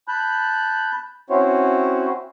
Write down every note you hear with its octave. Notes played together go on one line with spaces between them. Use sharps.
A5 B5 F#6 G6
C4 C#4 E4 F#4 C5 C#5